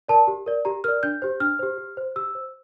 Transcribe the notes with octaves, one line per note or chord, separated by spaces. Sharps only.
A#4 D5 A5
G4
A#4 D5
G4 A#5
A#4 D5 F6
D4 G6
G4 C5
D4 F6
G4 C5
G4
C5
G4 E6
C5